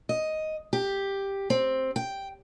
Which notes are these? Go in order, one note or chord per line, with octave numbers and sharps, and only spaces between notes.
D#5
G4
C4
G5